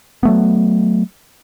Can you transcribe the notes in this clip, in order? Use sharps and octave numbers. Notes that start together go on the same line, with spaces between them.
F#3 A3 B3